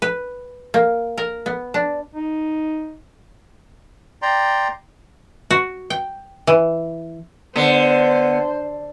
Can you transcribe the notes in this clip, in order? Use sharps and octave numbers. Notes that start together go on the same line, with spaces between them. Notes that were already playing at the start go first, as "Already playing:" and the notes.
B4
A#3
A#4
B3
D4
D#4
D5 G5 A#5 C6
F#4
G5
E3
D3 B3 C5